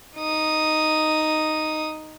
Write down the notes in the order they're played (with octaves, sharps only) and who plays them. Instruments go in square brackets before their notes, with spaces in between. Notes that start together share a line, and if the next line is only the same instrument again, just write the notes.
[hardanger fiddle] D#4 D#6